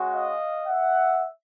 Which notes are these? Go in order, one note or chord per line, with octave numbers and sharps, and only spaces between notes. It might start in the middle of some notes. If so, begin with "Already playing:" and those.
Already playing: G#3 C#4 F#4
D#5 F5
E5 F#5